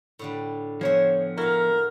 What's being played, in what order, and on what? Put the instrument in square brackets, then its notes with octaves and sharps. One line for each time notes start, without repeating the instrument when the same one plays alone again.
[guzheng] A2 D3 G3
[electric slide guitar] F3 B3 [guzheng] C5 E5 [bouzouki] C#5 G#5
[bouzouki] E4 [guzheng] F#4 F5 [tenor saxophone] A#4